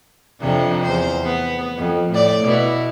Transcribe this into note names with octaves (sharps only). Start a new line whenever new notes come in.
F2 C3 D4
E2 C5
B3
F2
A2 D5
B2 E4